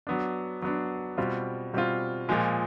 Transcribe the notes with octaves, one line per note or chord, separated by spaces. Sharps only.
F#3 B3 D4
F#3 B3 D4
B2 G3 C4 F4
B2 G3 C4 F4
A#2 F3 G#3